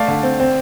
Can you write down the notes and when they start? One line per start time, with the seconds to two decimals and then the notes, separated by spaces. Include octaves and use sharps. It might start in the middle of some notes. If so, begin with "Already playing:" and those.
Already playing: A3 D5 F5
0.08 D3
0.23 C4
0.40 C4